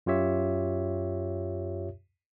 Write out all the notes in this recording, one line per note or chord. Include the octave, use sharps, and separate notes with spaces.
F#2 F4 G4 C#5 E5